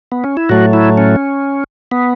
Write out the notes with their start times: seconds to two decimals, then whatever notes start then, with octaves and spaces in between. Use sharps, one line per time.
0.12 B3
0.24 C#4
0.37 E4
0.49 A2 F#3 A3 F#4
0.73 E4
0.98 C#4
1.91 B3